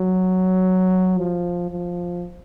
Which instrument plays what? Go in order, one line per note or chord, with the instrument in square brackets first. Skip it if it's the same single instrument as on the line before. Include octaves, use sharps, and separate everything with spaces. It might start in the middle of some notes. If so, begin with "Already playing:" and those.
Already playing: [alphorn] F#3
F3
F3